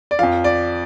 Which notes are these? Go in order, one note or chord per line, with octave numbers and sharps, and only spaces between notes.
D5
F2 F3 F5
D5